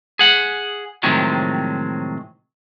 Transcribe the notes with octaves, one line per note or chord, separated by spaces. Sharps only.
G#4 F#5
A2 C3 D#3 F3 F#3 G#3